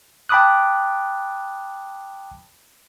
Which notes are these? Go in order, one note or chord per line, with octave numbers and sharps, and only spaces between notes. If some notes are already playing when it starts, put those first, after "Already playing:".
G5 A5 B5 D6 D#6 F#6